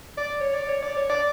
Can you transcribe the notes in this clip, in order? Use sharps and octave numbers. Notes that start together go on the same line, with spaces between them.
D5
C#5
D5
C#5
D5
C#5
D5